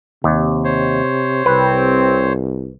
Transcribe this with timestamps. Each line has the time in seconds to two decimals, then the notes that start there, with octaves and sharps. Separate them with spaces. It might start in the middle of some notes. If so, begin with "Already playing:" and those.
0.24 D#2 C3
0.65 C5 C#5
1.46 C2 C3 C4 B4